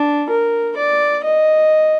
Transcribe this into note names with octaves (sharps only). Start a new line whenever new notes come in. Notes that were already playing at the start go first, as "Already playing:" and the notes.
Already playing: D4
A#4
D5
D#5